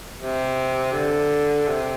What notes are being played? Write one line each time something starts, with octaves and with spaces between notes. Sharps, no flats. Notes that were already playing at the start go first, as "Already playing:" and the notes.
C3
D3
C3